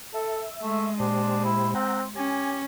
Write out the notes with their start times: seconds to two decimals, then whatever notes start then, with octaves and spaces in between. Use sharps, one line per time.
0.14 A4 E5
0.62 G#3 A3
1.00 A#2 D4 G4 C5
1.44 E4
1.75 C4 F#5 G5 A#5
2.16 C#4 G4 G#5